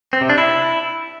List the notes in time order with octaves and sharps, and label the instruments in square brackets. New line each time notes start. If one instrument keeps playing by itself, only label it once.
[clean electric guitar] C4
C3
D4
E4